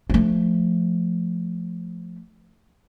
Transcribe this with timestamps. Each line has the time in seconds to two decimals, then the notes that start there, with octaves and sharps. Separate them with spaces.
0.10 F3 A3